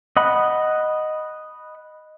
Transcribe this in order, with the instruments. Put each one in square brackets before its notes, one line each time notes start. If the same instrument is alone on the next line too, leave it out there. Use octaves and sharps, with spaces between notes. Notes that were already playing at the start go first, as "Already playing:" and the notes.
[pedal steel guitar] D#5 F#5 B5